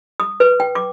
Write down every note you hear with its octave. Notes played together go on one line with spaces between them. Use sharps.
D#6
B4
G5
D6